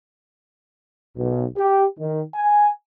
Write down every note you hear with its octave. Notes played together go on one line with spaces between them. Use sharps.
B1
G4
D#3
G#5